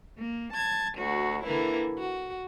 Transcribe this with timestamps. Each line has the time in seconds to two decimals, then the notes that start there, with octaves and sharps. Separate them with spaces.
0.18 A#3
0.54 A5 G#6
0.98 D2 F#4
1.43 D3 E3 A#3 E4
1.98 F#4